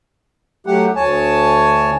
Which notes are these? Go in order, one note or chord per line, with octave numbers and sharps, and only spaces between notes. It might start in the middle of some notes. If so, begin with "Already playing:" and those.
F#3 A3 G4 F#5
D2 C#5 G#5 A5